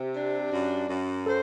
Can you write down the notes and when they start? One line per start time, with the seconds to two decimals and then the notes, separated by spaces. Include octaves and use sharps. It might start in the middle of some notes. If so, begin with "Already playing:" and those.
Already playing: C3 G4
0.14 D4
0.51 F#2
0.89 F#2
1.26 A4 C5